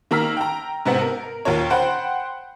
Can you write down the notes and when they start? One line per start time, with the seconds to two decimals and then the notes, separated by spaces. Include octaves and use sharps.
0.11 D#3 A#3 A#5 E6 F6 B6
0.37 G5 A#5
0.86 G#2 C3 B3 C4
1.01 A#4
1.45 D#2 A#2 A#4 C#5
1.70 C5 F#5 G5 B5 C6